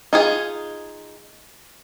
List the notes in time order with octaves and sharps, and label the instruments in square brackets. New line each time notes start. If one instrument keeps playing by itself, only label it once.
[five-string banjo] D#4 F4 G#4